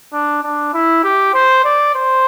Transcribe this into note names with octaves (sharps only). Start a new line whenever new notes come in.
D4
D4
E4
G4
C5
D5
C5